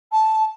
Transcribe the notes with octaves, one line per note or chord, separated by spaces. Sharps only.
A5